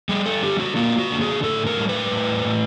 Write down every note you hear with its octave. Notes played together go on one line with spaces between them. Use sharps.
G3 G#4
A4
D3 G4
F#4
A#3 F4
F#4
D3
G#4
A2 A4
A#4
G3
B4
A2
A2